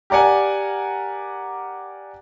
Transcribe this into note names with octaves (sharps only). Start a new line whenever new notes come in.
G4 A#4 D5 F#5 G#5